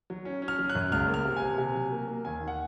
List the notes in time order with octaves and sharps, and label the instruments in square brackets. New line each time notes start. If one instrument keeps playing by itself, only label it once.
[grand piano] F#3
C#4
C#4
F6
F#3
F#6
F#2
C#2 F6
A#3
F6
C3
G#5
C3
C3 G#5
F#3
A#3
A#3
D#2 G#5
D#3
F#5